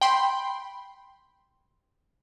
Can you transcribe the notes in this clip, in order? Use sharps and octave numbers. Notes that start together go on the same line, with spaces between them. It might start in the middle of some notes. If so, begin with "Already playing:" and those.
G5 B5 C6